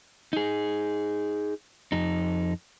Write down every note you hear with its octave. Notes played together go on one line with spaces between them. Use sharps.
D#4 G#4
F2 D#4